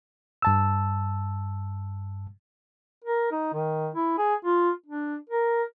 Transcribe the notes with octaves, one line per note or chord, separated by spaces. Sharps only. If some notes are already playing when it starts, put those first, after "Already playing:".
G2 A5 E6
A#4
D#4
D#3
E4
G#4
F4
D4
A#4